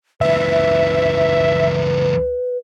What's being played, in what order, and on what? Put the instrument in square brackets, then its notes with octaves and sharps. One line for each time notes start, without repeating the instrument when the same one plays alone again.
[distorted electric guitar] C#2 E3 [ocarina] B4 [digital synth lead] E5